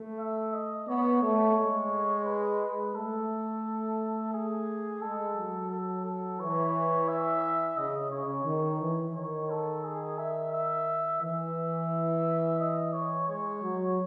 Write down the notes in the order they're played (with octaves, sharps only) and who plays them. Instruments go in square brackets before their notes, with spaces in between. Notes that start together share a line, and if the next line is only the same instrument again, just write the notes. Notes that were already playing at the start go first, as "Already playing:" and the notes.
Already playing: [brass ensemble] A3
[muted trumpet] E5
D#5
[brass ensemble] B3 [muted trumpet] C#5
[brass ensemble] A3
G#3
[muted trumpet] B4
[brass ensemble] A3 [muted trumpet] A4
[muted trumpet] G#4
[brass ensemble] G#3 [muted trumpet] A4
[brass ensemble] F#3
[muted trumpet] A4
A4
[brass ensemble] E3 [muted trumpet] C#5
[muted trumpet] E5
[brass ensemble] C#3 [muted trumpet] D#5
[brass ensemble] C#3 [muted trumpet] C#5
[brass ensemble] D#3
E3
[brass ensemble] D#3 [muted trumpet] C#5
[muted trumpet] A4
G#4
E5
E5
[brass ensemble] E3 [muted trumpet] E5
[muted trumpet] D#5
C#5
[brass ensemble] G#3 [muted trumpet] C#5
[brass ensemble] F#3